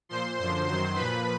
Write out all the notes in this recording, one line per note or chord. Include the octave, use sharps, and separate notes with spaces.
A#2 F3 C5 C6
F#2 D3 F3 C5 C6
F#2 D#3 F#3 C5 C6
A#2 F3 B4 B5